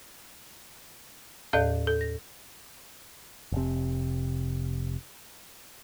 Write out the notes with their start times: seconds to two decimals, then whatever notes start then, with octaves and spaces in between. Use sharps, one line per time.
1.53 D#2 A2 A4 D5 F5 G6
1.87 A4
2.01 A#6
3.52 F1 C3